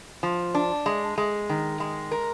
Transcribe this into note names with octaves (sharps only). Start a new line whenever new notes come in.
F3
D4
G#3
G#3
D#3
G#3
A#4